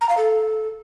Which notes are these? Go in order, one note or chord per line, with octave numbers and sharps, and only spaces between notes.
A#5
F5
A4